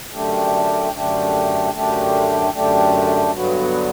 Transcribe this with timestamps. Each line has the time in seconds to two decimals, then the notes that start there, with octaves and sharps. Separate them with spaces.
0.12 F#2 D3 A3 D4 G4
0.92 F#2 D3 A3 D4 G4
1.72 F#2 D3 A3 D4 G4
2.52 F#2 D3 A3 D4 G4
3.32 G2 D3 F#3 B3 F#4